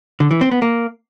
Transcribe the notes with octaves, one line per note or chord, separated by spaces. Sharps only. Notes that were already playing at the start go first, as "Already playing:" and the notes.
D3
E3
C4
B3
A#3